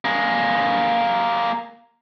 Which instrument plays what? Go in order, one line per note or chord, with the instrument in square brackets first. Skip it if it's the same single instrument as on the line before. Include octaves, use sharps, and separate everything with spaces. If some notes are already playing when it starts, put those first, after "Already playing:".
[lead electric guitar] A#3 G#4